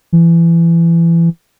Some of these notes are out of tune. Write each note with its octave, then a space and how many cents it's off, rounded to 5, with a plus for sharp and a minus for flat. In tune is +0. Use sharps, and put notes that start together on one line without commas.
E3 +25